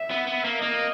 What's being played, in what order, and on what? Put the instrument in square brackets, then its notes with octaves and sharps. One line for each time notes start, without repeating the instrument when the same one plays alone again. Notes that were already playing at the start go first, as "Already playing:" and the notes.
Already playing: [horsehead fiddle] E5
[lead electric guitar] B3
B3
A#3
[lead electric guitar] A#3 [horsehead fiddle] D#5